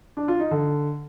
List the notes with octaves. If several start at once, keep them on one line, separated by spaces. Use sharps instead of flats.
D4
F4
D#4
D3